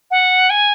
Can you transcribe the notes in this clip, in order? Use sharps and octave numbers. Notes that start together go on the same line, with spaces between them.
F#5
G#5